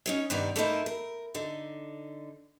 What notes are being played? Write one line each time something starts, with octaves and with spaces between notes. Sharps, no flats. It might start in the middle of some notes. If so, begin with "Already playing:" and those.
C#4 D#4 C#5
G2 C3 D#3 B3 D5 A#5
A3 A#3 C4 D#4 E4 A#4
A#4
D3 D#4